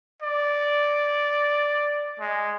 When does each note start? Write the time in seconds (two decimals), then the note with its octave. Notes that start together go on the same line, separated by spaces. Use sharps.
0.22 D5
2.20 G#3